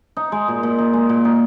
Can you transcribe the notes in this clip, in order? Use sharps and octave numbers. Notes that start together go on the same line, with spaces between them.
D#4
G#3
A#2
A#2
D#4
G#3
A#2
D#4